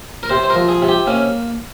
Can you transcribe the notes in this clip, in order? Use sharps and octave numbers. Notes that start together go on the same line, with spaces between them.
A#4
C3 C5
C5
A#4
F3
G#4
C3
G4
A#3 C#4